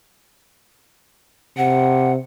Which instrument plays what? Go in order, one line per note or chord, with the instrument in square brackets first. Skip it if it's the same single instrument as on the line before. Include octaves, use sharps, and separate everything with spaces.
[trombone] C3 [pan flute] F#5